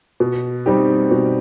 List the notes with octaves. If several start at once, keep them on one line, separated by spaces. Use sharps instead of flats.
B2
G3 C4 D#4 G4
B2